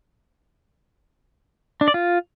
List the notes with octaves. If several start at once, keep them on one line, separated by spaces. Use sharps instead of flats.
D4
D5
F4